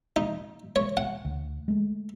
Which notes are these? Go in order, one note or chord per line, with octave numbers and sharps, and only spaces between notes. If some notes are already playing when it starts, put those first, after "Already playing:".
D#4
C#5
F#5
D2
G#3 A3